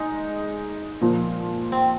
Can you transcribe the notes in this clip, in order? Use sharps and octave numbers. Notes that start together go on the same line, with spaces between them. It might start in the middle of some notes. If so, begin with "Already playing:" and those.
Already playing: G#3 D#4
A#2 F3 A#3
C4